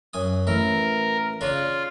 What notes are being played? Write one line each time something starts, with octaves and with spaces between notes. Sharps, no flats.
F#2 G#5 D#6
A1 E3 A#4 E5
C#3 D4 F4 C#6